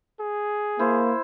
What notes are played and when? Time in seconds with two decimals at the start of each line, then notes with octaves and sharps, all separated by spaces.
0.20 G#4
0.79 A#3 E4 C5